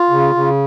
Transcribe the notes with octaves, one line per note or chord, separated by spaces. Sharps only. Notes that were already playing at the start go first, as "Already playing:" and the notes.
Already playing: F4
C#3
C#3